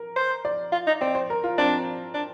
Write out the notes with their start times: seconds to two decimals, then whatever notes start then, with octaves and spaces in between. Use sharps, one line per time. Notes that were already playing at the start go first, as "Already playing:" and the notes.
Already playing: A#4
0.16 C5
0.45 D5
0.72 F4
0.87 D#4
1.01 C4 D5
1.15 C5
1.30 A#4
1.44 F4
1.58 C4 D4
2.14 D4